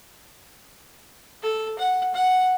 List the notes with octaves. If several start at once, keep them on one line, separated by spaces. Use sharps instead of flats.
A4
F#5
F#5